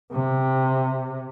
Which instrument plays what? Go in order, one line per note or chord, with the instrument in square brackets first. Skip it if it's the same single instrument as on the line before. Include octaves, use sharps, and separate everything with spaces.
[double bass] C3